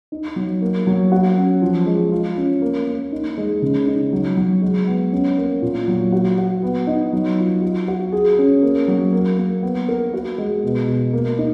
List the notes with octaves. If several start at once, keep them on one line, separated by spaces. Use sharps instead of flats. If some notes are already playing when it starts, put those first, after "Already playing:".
D#4
F#3
A#3
F#3
F#4
C#4
F3
G#3
F4
C#4
A#3
A#3
D#4
G#3
C#3
D#4
F#3
F#3
G#3
B3
C#4
A#3
A#2
F#3
F#4
F#4
B3
D#4
F#3
F4
F#4
F#4
G#4
C#4
A#3
F#3
A#3
A#3
B3
A#4
F#4
G#3
B2
B2
A#3
D#4